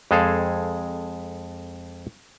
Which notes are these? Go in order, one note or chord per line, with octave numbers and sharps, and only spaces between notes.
F2 G#3 G#4 A4 C5 F5